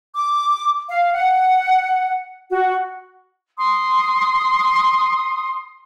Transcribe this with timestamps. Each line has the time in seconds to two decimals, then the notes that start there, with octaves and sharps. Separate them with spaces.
0.16 D6
0.89 F5
1.14 F#5
2.50 F#4
3.58 C6 D#6